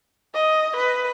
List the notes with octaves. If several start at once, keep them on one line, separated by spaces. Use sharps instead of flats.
D#5
B4